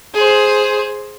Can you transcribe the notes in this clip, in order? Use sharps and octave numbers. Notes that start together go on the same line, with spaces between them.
G#4 C5